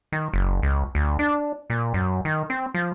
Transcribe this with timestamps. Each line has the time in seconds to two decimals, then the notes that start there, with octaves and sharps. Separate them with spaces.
0.12 D#3
0.33 F#1
0.62 C#2
0.95 D2
1.19 D4
1.70 A#2
1.94 F#2
2.25 D#3
2.50 C4
2.74 F3